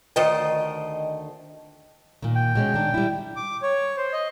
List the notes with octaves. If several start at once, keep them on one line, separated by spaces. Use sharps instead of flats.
D2 D#3 A3 C5 D#5 G5
A#2 D#3
G5
B2 G#3 C#4
D#3 D4
G3 E4
D6
C#5
C5
D#5